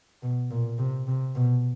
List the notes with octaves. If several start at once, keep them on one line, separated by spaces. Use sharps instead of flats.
B2
A#2
C3
C3
B2